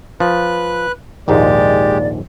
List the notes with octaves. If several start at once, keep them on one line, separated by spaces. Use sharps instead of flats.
F3 B4 F#6
A#1 D#2 G#2 G#3 G4 D5